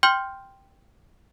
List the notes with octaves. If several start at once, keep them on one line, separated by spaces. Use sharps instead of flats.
G5 C6 F6 G6 G7